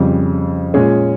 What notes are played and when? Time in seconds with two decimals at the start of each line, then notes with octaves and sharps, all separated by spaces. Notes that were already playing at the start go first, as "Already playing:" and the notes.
Already playing: F2 C#3 G3
0.74 A#2 G#3 C#4 G#4